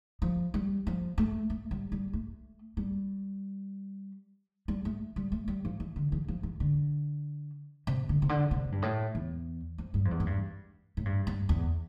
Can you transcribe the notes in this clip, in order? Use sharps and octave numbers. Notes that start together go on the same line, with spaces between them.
F3
G3
F3
A3
A3
G3
G3
A3
G3
G3
A3
G3
A3
G3
F3
E3
D3
E3
F3
E3
D3
C3
D3
C3
D3
C3
G2
A2
E2
F2
G2
F2
E2
A2
G2
A2
G2
G2
E2